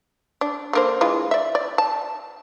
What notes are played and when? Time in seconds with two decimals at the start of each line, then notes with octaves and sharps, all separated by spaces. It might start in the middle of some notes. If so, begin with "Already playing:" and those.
0.41 D4
0.73 D3 A#3 C5
1.01 E3 G#3 F4
1.31 D5 E5
1.55 D5
1.78 A5